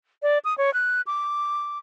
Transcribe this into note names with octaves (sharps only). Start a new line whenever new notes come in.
D5
D#6
C#5
F#6
D6